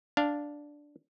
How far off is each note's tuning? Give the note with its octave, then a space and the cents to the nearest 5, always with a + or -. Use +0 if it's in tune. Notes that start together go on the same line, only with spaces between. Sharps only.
D4 +0 F5 +0